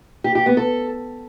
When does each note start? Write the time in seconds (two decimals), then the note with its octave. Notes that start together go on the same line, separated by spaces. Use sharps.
0.24 G4
0.35 G4
0.46 B3
0.57 A4